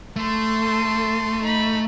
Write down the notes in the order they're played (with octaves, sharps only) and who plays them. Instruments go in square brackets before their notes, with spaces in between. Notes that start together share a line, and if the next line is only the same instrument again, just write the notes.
[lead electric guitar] A3 [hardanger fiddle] A4 C6
[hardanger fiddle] D#4 B5